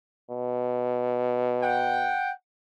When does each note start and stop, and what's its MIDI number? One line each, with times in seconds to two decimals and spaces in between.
0.31 2.14 47
1.62 2.31 78
1.62 2.31 79